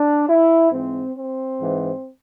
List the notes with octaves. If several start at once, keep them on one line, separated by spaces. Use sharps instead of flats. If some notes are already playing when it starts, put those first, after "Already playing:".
Already playing: D4
E4
G#2 E3 C4
C4
G#2 E3